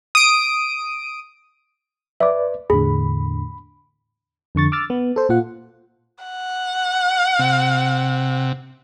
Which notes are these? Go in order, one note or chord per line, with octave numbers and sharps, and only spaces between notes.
D#6 D7
B4 D5 E5 D6
E2 A2 D3 G#4 B5
F2 D3 C#6 A6
D6 E6 F6 A6
B3
A4 C5
A#2 F4 F#5
F#5
C3